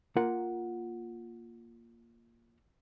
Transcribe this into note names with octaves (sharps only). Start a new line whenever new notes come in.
A#3 F4 A#4 F#5